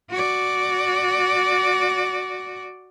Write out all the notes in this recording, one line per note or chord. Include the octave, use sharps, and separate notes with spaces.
F#4 D5